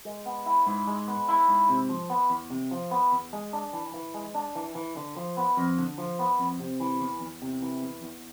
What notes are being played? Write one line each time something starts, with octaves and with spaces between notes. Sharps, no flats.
G#3
B3
E4
G#2
G#3
B3
E4
G#2
C3
F3
B3
E2
C3
F3
B3
E2
G#3
D4
E3
E3
G#3
D4
E3
E3
D3
F3
B3
F2
D3
F3
B3
F2
C3
E3
E2
E2
C3
E3
E2
E2